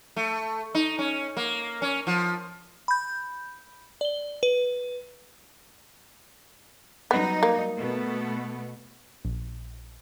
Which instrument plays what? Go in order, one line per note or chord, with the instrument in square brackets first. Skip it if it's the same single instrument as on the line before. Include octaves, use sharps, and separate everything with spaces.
[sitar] A3
D#4
C#4
A#3
C#4
F3
[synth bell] B5 G6
D5 G7
B4
[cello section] F#3 G3 D#4 [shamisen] B3
[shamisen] A#3
[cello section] B2 A3 B3
[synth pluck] A#1